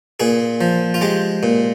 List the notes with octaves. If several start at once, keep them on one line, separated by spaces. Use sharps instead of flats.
A#2 G#4
F3
F4
G#3 G4
A#2